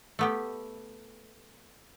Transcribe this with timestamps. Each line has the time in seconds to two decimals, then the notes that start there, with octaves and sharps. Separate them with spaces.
0.19 A3 B3 G4